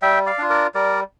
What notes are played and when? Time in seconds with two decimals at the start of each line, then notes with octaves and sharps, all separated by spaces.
0.02 G3 E5 G5
0.26 D5 F5
0.38 D4 F4
0.50 A#4 D5
0.75 G3 A#4 D5